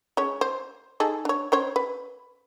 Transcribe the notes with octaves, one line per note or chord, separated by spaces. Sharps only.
G#3 C#4 C#5
C5
D#4 G#4 A4
D4 C#5
C#4 C5 C#5
B4